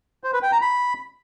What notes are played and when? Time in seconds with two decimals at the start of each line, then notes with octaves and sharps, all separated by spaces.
0.24 C5
0.33 B4
0.43 G5
0.52 A#5
0.61 B5